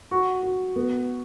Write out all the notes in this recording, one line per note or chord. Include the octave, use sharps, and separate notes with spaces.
F#4
F#4
B3